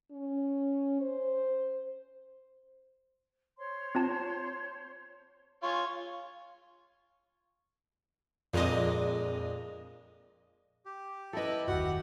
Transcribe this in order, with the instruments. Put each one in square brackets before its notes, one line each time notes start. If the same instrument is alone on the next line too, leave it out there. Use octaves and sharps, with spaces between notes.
[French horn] C#4
C5
[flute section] C5 C#5 C6
[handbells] C4 F4 A5
[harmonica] F4 C#5 [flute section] G#5
[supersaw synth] F2 D#5 [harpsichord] A#2 G#3 D4
[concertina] G4
[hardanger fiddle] E4 B4 [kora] A4 D#5
[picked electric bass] F#1 D#2 [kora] F#4 [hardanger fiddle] F#5